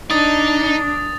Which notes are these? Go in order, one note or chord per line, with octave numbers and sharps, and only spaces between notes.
D4 D#4 D#6 A6